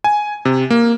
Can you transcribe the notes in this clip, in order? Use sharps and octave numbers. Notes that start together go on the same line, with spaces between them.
G#5
C3
A#3